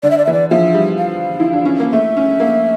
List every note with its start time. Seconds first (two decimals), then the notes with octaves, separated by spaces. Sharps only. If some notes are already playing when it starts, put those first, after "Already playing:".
0.03 D3 D5
0.11 E5
0.18 D5
0.25 E3 E5
0.33 D5
0.50 F3 E5
0.74 G3
0.98 F5
1.40 E4
1.53 D4
1.65 C#4
1.80 A#3
1.93 A3 E5
2.17 C#4
2.40 A#3